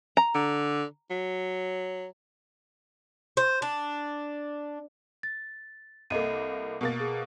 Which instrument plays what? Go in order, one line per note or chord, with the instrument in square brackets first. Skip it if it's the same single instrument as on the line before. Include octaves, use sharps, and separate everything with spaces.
[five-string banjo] A#5
[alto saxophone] D3
F#3
[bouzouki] C5
D4
[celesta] A6
[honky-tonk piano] C2 A#3 [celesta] A4 D#5 D#7
[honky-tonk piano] B2 A#3 A6
[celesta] G#4